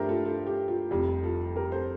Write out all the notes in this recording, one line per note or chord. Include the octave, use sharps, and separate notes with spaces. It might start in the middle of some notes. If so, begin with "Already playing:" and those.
Already playing: G2 F3 A3 D4 G4 A#4 C5 E5
F4 A4
F4 A4
G4
F4
F1 F2 C3 G3 G4
F4 A4
G4 A#4
A4 C5